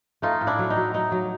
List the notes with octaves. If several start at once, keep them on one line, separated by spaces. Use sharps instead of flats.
A3 D#4 F4
A2
D4 E4
F#3
D#4
F#3
F#3 D#4
F#3